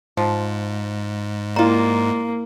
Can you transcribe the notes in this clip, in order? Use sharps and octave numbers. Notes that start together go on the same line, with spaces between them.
G#2 F3
G3 A#3 E4 F4 A#5